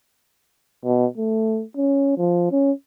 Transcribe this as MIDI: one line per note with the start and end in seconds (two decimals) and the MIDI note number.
0.84 1.06 47
1.17 1.64 57
1.77 2.16 61
2.18 2.47 53
2.51 2.72 61